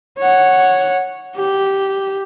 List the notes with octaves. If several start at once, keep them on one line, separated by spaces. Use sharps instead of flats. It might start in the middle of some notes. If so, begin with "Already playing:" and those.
C#5 F#5
G4